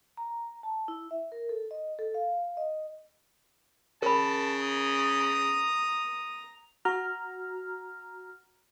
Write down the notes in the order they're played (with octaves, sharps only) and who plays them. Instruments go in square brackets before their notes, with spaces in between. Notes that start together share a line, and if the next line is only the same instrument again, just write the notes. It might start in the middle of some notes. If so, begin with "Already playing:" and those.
[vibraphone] A#5
A5
E4
E5
A#4
A4
D#5
A4
F5
D#5
[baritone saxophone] C#3 [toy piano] A#4 B5 [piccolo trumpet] A5
[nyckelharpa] A#5 [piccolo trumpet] D#6
[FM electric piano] F#4 A#5 F6